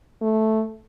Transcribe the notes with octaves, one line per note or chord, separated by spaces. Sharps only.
A3